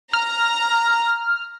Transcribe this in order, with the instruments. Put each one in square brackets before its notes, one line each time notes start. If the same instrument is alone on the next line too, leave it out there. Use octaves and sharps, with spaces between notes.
[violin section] A#5 [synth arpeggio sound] F6